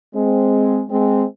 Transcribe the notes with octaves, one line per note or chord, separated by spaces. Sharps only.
G#3 C4
G#3 C4